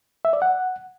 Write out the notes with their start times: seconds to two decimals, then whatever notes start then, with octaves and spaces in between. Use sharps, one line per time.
0.25 E5
0.33 D5
0.42 F#5